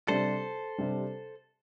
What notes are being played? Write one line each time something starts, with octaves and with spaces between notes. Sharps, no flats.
C3 G3 D4 A4 C5
C3 G3 D4